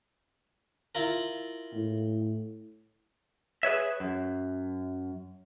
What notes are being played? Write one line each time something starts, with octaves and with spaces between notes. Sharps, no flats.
E4 F4 A#4
A2
G#4 B4 C#5 E5
F#2